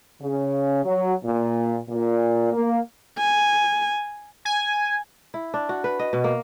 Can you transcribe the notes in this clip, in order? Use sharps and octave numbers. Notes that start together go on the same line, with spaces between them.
C#3
F#3
A#2
A#2
A#3
G#5
G#5
E4
D4
F#4
B4
D#5
B2
A#3